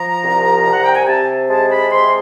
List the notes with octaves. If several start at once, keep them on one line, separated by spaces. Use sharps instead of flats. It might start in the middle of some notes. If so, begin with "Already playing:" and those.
Already playing: F3 A#5
C2
C3
F#5
G5
G#5
C3 A5
G#3 A5
B5
C3 C6